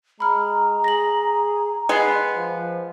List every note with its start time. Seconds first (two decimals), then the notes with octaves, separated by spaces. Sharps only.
0.20 G#3 A#5 B5 F6
0.84 G#4 A#6 F#7
1.89 G#3 B3 G#6 C7
2.37 F3